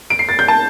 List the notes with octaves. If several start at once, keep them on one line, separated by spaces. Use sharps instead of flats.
D7
C7
A6
G6
A5